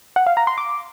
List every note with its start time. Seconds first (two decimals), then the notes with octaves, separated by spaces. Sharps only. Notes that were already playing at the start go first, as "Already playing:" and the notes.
0.16 F#5
0.27 F5
0.37 A#5
0.47 C6
0.58 D6